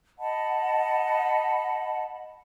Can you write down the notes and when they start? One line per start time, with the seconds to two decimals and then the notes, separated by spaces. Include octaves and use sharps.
0.18 D#5 F#5 A5 B5